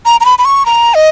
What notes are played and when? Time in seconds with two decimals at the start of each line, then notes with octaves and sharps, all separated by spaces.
0.06 A#5
0.21 A#5
0.25 B5
0.39 B5
0.45 C#6
0.66 A#5
0.94 D#5